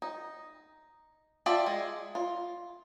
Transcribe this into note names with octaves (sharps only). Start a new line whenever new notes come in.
D#4
F4 D5 E5 G5 A5
G#3
F4